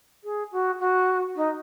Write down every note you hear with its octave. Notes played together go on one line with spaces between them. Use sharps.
G#4
F#4
F#4
D#4